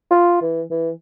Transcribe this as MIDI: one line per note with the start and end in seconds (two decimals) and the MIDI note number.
0.11 0.39 65
0.42 0.62 52
0.71 0.90 52